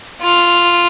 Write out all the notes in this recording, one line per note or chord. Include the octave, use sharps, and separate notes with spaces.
F4